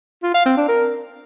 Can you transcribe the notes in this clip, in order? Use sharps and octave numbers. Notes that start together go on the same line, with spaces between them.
F4
F5
C4
D4
A#4